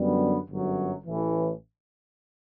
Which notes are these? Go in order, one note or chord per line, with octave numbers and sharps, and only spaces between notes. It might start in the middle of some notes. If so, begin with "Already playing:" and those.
Already playing: F#2 D3 G3 B3
G1 F#2 F#3
A1 A2 E3